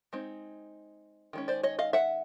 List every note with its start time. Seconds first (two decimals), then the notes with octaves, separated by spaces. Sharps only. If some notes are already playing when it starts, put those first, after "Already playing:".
0.13 G#3 C4 D#4
1.33 D#3 G#3 C#4
1.48 C5 D5
1.63 C#5 D#5
1.79 D#5 F5
1.93 E5 F#5